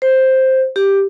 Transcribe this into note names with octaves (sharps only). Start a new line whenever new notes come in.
C5
G4